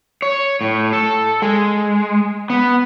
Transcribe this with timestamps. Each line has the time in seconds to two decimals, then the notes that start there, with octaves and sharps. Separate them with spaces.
0.22 C#5
0.61 A2
0.93 A4
1.42 G#3
2.50 B3